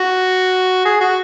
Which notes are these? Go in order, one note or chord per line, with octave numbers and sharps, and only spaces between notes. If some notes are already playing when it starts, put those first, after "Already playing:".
Already playing: F#4
G#4
F#4